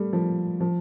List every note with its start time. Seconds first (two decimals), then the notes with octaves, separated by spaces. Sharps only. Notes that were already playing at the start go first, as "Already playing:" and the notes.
Already playing: G3 A3
0.13 F3
0.60 F3